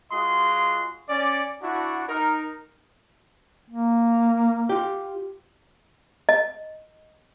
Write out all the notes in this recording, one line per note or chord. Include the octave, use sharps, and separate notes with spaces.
G#3 F4 F#4 D#5 C6
C#4 D5
D4 E4 F#4
D#4 A#4
A#3
F4 G4
D#5